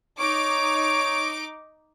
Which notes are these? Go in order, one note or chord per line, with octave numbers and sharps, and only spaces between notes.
D#4 C#5 D6 D7